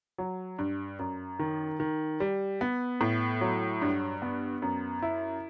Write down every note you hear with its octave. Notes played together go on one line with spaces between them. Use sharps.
F#3
G2
F#2
D#3
D#3
G3
B3
A2
F#3
G2
B3
F#2
E4